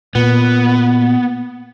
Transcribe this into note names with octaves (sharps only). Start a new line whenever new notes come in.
A#2 B3